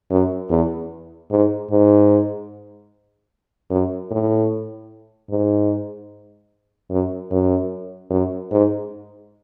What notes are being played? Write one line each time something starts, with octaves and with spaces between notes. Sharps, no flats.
F#2
E2
G#2
G#2
F#2
A2
G#2
F#2
F#2
F#2
G#2